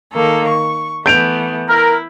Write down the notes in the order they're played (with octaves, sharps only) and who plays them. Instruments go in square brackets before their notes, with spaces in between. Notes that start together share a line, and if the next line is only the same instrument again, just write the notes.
[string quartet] D#3 A#3 A4
C#6
[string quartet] E3 A3 B3 [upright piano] G6 D7 F7
[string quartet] E4 [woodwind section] A#4